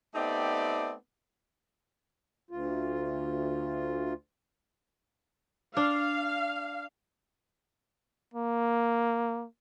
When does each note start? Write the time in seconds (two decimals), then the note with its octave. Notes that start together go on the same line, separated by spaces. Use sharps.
0.14 A3 B3 C4 D#4 G4 D5
2.51 D2 F4
5.77 D4 F5
8.34 A#3